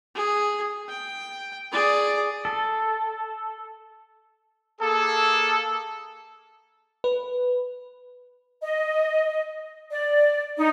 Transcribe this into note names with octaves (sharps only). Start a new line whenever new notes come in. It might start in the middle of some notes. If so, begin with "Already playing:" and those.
G#4
G5
G#4 D5
A4
A#3 G#4 A4
B4
D#5
D5
D#4